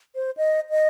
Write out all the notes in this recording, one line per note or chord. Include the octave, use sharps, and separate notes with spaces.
C5
D#5
D#5